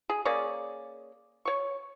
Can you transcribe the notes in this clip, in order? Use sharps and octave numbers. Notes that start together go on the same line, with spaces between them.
G#4
A#3 C#4 G#4 D5
C#5 C#6